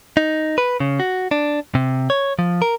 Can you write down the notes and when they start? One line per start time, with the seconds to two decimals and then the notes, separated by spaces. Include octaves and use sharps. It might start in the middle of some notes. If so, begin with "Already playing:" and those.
0.17 D#4
0.58 B4
0.80 C#3
1.00 F#4
1.31 D4
1.75 C3
2.10 C#5
2.39 F3
2.62 A#4